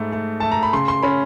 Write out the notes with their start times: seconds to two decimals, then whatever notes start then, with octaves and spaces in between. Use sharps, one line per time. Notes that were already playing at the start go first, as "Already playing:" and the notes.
Already playing: G#2 A3
0.12 A3
0.40 A3 A5
0.52 A#5
0.63 B5
0.73 C#3 C6
0.88 C6
1.03 C#4 B5